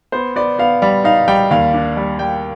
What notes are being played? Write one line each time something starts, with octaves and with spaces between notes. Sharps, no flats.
B3 C5
B3 D5
B3 F5
G3
D#4 F5
G3 G5
D#2 F5
D4
G3
G3 G5